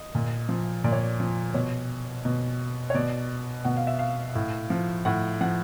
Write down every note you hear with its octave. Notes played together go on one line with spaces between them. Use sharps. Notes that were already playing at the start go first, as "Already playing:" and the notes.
Already playing: D#5
A#2
F3
A#2 D5
C#5
D5
F3
B2 C#5
B2
C#5
B2 D5
B2 F#5
F5
E5
F5
A2
F3
A2 F#5
F3 F#5